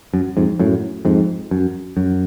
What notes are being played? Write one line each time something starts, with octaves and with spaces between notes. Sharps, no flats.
F#2
F2 G#2
F#2 A2
F2 G#2
F#2
F#2